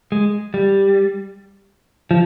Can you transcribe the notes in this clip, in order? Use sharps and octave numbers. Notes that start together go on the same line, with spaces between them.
G#3
G3
F3